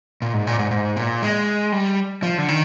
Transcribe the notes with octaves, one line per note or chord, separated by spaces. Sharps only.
A#2
G#2
A#2
G#2
G#2
A#2
G#3
G3
F3
D3
D#3